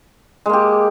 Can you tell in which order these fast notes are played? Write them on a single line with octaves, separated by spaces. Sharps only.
G#3 A#3 G4